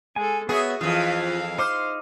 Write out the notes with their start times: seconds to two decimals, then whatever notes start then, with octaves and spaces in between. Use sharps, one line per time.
0.16 G#3 A4 G#5
0.49 B3 F#4 G#4 C#5 E5
0.81 F2 E3 F4 F5
1.58 D#4 C5 D6 F6